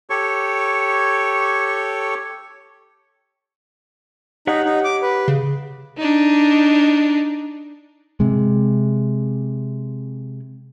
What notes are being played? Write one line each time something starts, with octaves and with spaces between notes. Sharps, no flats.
G4 A4 C#5 C#6
D#4 G4 C#5 F#5
D#4
D6
B4
C#3
D4 D#4
C3 G#3